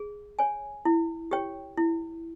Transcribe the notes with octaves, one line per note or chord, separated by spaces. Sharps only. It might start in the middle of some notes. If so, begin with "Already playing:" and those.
Already playing: G#4
C#5 G#5
E4
G4 C#5 G5
E4